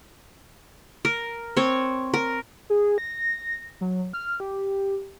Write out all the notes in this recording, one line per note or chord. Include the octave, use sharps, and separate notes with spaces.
A#4
C4 C#5
A#4
G#4
A#6
F#3
F6
G4